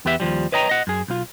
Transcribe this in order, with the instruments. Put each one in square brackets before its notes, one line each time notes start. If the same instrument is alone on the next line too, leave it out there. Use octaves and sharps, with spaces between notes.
[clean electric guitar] E2 B3 G4 E5
D#2 F3 G3
B4 C#5 D#5 G5 A#5
D#5 F#5
F#2 G#4
B1 F4